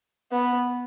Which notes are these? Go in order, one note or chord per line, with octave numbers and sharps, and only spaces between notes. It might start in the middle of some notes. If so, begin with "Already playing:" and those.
B3